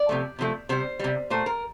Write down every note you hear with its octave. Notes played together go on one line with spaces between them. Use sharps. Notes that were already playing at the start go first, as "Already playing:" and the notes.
Already playing: D5
C3 F3 A3
C3 F3 A3
C3 G3 C5
C3 G3
A#2 A3 C5
A#4